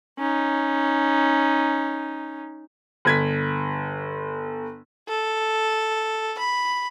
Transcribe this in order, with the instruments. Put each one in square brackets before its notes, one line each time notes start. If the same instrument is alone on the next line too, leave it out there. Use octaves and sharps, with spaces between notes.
[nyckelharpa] C#4 D#4
[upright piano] G1 G#6 B6
[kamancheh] A4
B5